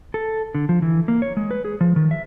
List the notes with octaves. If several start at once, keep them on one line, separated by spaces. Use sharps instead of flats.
A4
D3
F3
E3
A#3
C#5
G#3
B4
G#4
F3
D#3
E5